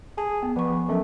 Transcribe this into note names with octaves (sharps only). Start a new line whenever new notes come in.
G#4 A5
B3
F3 B3 C#6
F#3 A3 C#4 A#4